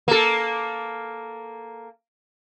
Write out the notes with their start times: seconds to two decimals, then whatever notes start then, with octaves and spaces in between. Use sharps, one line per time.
0.08 A#3 A4